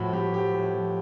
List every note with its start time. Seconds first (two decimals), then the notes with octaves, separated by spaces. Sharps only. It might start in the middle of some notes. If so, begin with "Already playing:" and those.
Already playing: A2 F3 F#4
0.13 A2 G4
0.33 F3 G4
0.54 A2
0.74 F3